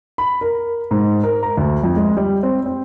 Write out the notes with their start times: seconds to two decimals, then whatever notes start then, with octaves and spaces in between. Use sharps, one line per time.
0.18 B5
0.41 A#4
0.91 G#2
1.23 A#4
1.43 A#5
1.57 D2
1.83 F2
1.96 G#3
2.17 G3
2.43 C4
2.66 C4